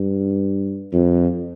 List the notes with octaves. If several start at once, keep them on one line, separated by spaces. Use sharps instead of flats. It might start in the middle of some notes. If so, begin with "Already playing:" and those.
Already playing: G2
F2